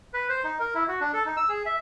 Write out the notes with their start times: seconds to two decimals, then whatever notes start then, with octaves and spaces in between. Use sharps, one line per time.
0.14 B4
0.29 C5
0.44 D#4
0.60 A#4
0.75 E4
0.88 F#4
1.01 D4
1.13 A4
1.26 D#4
1.37 E6
1.49 G#4
1.66 E5